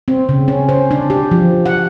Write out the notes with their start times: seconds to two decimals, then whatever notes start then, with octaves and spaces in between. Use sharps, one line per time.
0.08 C4
0.29 C#3
0.48 C#4
0.69 C5
0.91 D4
1.10 G4
1.31 F3
1.66 F#5